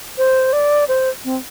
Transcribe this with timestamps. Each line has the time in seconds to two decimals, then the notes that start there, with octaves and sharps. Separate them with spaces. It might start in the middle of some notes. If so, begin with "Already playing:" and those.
0.18 C5
0.53 D5
0.88 C5
1.25 C4